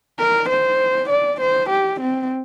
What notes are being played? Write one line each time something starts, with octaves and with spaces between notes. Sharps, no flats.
A#4
C5
D5
C5
G4
C4